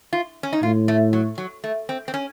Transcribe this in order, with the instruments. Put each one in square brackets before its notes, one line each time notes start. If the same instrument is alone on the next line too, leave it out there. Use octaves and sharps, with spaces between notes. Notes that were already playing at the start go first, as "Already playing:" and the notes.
[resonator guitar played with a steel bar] F4
C#4
D#4
[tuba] A2 [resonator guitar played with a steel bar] F4
[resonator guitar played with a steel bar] A3
F#3
F#3
A3
C4
C4
C#4